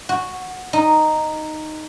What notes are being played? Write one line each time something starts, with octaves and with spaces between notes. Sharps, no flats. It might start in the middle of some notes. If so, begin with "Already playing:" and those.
F#4
D#4